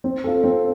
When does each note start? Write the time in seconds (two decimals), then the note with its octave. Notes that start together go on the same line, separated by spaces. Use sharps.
0.04 C4
0.24 F4 A4
0.44 C4